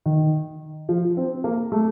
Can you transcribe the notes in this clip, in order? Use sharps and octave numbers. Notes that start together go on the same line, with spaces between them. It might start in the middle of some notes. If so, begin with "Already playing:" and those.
D#3
F3
C4
A#3
A3